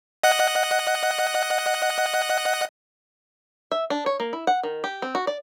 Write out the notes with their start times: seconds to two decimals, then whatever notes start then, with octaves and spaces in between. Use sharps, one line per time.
0.23 D#5 F#5 F#6
3.72 E5
3.90 D4
4.06 C#5
4.20 A#3
4.33 E4
4.47 F#5
4.63 D#3
4.84 G4
5.02 C4
5.15 F#4
5.27 D5